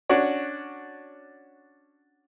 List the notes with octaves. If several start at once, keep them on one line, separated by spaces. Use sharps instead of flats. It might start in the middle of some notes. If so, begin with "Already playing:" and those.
C#4 D4 F#4